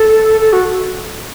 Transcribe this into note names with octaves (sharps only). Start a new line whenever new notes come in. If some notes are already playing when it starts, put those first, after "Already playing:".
Already playing: A4
A4
F#4